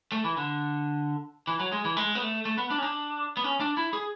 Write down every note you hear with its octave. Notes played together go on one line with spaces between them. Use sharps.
A3
E3
D3
E3
F#3
G#3
E3
G#3
B3
A3
A3
B3
D4
C#4
D4
B3
C#4
D4
E4
G#4